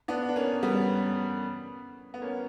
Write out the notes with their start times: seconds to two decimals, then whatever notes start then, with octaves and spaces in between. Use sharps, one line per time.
0.08 B3 D4
0.29 D4
0.36 A#3 C#4
0.63 G3 B3
2.14 B3
2.22 A#3 C#4